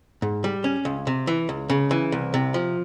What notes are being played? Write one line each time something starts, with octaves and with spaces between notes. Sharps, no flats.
G#2
G3
C#4
C#2
C3
E3
C#2
C#3
E3
C2
C3
F3